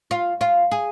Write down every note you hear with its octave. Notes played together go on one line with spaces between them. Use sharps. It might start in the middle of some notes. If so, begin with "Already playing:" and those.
F4
F4
G#4